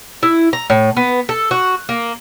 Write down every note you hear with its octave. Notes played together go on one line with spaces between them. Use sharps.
E4
A#5
A2
B3
A4
F#4
A#3